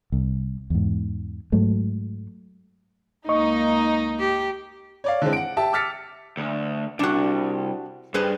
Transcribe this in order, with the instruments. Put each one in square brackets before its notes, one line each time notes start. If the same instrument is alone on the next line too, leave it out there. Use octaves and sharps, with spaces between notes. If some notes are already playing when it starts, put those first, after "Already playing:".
[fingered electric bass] C2
E2 G#2
G#2 F#3 A3
[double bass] C#2 A#3 [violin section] D#4 [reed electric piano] D#5 C#6
[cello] G4
[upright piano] C#5 D5 F5
D3 E3 G#3 C4
F#5 D7
G4 E5 A5
D6 E6 F6 A6 B6 C#7
[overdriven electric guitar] D2
[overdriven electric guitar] C2 [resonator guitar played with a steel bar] D4 F#4
[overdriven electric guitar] G2 [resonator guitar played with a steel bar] G#4 B4 C5